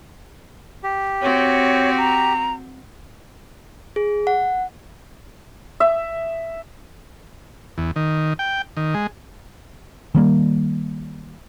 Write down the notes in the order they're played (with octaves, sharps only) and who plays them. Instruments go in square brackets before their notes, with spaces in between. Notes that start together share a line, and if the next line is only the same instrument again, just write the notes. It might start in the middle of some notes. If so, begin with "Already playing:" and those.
[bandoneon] G4
[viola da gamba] C4 F#4 [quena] C#5
[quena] A#5
[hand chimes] G#4
F#5
[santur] E5
[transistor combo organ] E2
D#3
G5
D#3
G#3
[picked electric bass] D#3 G3 A#3